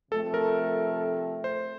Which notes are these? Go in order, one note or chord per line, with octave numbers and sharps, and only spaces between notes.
C3 F3 A3 C4 A4
A#4
C5